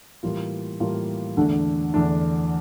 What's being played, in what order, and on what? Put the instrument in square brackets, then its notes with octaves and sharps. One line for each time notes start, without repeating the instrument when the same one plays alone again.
[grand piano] A2 E3 G3 A#3 F4
A2 E3 G3 A#3 F4
E2 D3 A3 D4
E2 D3 A3 D4